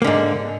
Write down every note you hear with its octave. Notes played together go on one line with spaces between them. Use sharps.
G#2 D3 A#3